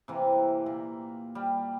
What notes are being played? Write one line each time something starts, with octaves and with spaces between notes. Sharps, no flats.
C3 E3 A#3
A#2
G3